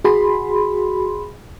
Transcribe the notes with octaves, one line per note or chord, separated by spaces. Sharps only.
F#4 G#4 B5 C6